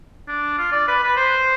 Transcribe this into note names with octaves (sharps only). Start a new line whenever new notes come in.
D4
F4
D5
B4
B4
C5